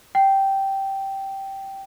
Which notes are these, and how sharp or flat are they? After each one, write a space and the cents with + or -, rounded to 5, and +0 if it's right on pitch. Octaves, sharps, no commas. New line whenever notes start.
G5 -10